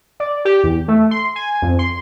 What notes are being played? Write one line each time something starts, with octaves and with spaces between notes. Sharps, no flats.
D5
G4
E2
A3
C6
G#5
F2
C6